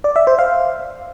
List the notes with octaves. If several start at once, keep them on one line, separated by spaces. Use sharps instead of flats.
D5
E5
C5
F5